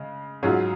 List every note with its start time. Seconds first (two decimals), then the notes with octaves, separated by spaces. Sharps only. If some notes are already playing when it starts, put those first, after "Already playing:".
Already playing: C#3 G#3
0.43 G#2 F#3 C#4 F4 G#4